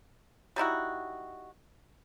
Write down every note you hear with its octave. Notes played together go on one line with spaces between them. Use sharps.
G3 D#4 E4 F#4